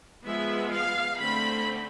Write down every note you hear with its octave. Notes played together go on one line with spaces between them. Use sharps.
F3 G#3 B3 E5
F5
D3 A3 C4 B5